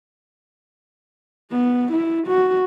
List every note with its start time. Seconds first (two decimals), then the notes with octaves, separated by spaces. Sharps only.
1.51 B3
1.92 E4
2.27 F#4